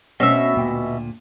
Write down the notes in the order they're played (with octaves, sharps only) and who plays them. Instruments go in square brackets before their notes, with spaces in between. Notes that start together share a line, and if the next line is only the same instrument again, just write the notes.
[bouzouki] B2 E5 [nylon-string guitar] A3 C4 C#4
[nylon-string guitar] D2 A#2 G5